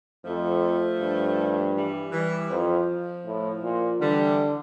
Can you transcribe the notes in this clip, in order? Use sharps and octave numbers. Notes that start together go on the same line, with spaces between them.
F2 F3 A3
G2
E3 G3
E3 G3
F2 F3
A2
A#2
D3 E3 G3